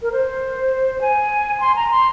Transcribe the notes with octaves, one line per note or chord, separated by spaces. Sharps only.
A#4
C5
G#5
C6
A#5
C6